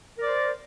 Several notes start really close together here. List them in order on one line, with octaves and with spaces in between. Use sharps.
A#4 D5 C5